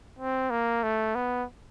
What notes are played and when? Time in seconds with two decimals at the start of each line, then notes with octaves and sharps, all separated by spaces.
0.18 C4
0.50 A#3
0.83 A3
1.15 B3